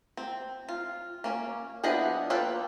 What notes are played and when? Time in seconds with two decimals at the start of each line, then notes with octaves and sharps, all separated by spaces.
0.17 C4
0.69 F4
1.24 A#3 C#4
1.83 F3 B3 D4 E4 D#5
2.30 A#3 F4 A4 B4 G5